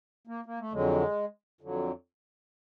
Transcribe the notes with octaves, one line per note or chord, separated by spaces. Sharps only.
A#3
A#3
A3
F2 D3 F#3 G#3
F2 D3 F#3